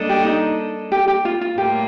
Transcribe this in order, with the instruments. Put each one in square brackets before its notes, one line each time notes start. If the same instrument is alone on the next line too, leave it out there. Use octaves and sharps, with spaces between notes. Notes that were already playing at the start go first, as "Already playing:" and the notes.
Already playing: [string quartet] G3 A#3 D4 A4 D#5
[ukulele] G4
D#4
G4
G4
F4
F4
[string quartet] A2 G3 A#3 F4 [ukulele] G4